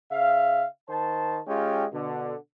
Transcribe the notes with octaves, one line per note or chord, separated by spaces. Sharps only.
C#3 E5 F5
D#3 C5 A5
G#3 C#4 F4 G4 G5
B2 D3